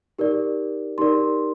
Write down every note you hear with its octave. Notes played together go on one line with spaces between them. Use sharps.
D#4 G4 A#4 D5
D#4 G4 A#4 D5 C6